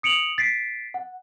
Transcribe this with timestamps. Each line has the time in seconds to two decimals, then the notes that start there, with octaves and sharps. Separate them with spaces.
0.03 D#6 C#7 D7 F7 F#7
0.38 A6 B6 C7 D7
0.94 F#5